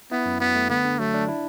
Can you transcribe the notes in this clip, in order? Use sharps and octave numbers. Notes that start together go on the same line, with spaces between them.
B3 E4
F#2
F#3 B3
A3
D3 B3
D3
F#3 A3
D4
E4